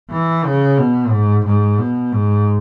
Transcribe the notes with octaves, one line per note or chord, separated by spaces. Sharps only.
E3
C#3
B2
G#2
G#2
B2
G#2